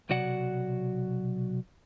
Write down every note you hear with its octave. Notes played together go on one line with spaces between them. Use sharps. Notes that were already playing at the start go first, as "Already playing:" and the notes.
B1 C3 F#3 F#4 D5 F#5